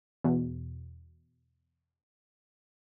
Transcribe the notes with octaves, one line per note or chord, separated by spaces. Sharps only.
E2 B2